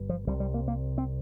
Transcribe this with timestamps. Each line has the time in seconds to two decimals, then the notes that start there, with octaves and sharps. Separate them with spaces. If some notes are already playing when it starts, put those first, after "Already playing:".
Already playing: G1 G2
0.09 F3
0.27 C2 C3 G3
0.40 G3
0.54 A#3
0.68 A#3
0.98 C4